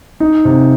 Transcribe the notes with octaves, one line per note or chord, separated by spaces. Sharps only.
D#4
C3